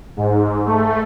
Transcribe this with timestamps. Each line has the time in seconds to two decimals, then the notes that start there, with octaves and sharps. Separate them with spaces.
0.17 G#2
0.66 A3